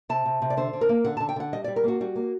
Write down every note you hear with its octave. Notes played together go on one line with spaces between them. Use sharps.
C3 A5
C3
C3
D5
D3 C5
D3
A#4
A#3
D3 F#5
D3 A5
G5
D3 F#5
G3 D#5
G3 D5
A#4
A#3 F#4
G3 F#4
A#3